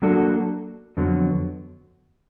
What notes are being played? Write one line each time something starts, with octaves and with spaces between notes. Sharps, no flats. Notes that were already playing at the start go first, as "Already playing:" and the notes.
F#3 A#3 D4 F#4 A4
F2 D3 F#3 B3